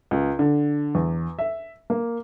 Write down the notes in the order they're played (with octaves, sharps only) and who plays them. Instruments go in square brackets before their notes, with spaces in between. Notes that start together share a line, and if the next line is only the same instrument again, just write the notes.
[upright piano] C#2
D3
E2
E5
A#3